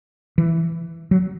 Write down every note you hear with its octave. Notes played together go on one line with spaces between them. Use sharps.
E3
F#3